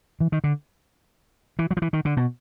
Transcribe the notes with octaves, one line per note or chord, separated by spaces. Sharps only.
E3
D#3
D3
E3
F#3
F3
E3
D#3
D3
B2